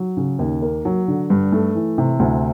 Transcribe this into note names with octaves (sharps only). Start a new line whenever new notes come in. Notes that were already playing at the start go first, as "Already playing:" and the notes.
Already playing: F#3
C#3
D#2
A#3
F#3
D3
G2
A3
E3
C3
D2